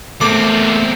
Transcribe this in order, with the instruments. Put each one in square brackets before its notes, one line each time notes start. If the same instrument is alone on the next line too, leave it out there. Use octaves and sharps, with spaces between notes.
[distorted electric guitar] E2 C4 [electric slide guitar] A3 [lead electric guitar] A#3 A4 [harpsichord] D6